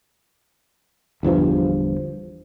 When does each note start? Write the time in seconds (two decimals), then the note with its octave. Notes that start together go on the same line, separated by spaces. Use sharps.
1.23 G1 E2 G2 F3